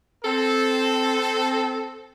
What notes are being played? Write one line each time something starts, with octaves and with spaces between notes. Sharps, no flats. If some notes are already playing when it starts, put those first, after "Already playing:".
C4 A4